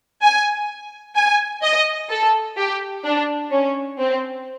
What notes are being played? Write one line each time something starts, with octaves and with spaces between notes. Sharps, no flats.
G#5
G#5
D#5
A4
G4
D4
C#4
C4